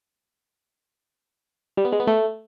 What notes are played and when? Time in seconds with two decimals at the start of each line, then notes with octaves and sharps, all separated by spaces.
1.77 G3
1.85 B3
1.92 G#3
2.00 B3
2.07 A3